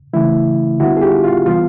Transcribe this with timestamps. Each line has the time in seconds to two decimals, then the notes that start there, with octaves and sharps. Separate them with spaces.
0.13 C#3 E3 A3 E4
0.79 D3 G3 B3 E4 F#4
0.97 G#4
1.02 F4 G4
1.24 F4
1.46 C3 E3 G3 B3 F4